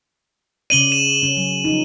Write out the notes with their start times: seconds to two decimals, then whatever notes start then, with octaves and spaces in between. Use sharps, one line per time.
0.70 C#3 C#4 D5 D#7 F#7 G7
0.92 E7
1.22 C#3 C#4
1.37 F#3
1.64 F3 D#4